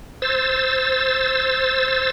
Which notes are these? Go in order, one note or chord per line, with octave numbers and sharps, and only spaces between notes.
C5 E6 A6